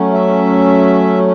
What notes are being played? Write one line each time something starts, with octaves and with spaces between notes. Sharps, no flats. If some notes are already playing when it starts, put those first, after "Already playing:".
Already playing: F#3 A3 C#4
E5